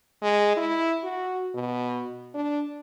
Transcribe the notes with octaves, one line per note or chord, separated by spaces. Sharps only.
G#3
E4
F#4
B2
D4